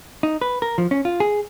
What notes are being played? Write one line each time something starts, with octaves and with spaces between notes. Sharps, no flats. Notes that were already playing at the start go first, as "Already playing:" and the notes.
D#4
B4
A#4
F3
C#4
F4
G#4